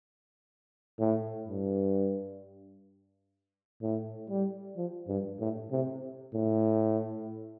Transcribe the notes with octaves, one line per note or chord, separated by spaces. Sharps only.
A2
G2
A2
G3
F3
G2
A2
C3
A2